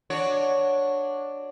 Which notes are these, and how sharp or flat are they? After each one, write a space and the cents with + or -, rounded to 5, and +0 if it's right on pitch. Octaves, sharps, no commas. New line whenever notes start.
D4 +0 F#4 -10 C#5 +0